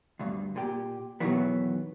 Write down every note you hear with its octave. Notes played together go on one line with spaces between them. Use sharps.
D2 G2
A#2 G4
E2 B2 D#3 E3 F#3 B3